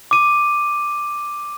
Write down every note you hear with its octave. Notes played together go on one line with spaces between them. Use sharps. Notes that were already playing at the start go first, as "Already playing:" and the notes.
D6 D#7